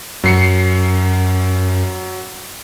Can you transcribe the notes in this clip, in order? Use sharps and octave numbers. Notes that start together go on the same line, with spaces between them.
F#2 F#3 C7 C#7